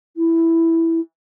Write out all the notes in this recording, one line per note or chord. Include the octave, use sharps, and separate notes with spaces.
E4